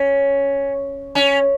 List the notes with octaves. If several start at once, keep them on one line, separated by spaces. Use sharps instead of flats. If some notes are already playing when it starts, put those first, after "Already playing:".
Already playing: C#4
C#4